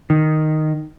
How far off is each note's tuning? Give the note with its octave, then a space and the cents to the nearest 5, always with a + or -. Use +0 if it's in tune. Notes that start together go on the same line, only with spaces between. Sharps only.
D#3 -5